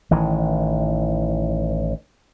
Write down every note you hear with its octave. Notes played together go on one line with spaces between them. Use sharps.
A1 D#3 E3